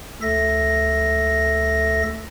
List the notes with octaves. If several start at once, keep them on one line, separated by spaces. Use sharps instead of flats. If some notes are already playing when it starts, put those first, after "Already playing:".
D2 A4 E5 A#6